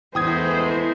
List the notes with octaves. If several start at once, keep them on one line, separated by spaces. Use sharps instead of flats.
E2 E3 G#3 A3 C5 G5 D#6 G#6